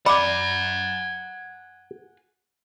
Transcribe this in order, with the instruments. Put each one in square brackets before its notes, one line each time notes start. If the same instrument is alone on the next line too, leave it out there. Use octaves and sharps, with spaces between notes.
[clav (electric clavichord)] D5 [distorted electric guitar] F#5 G#5 [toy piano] B5